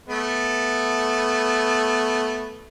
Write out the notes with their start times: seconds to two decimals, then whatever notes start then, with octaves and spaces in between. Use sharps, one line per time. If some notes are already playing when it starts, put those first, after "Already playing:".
0.08 A3 B3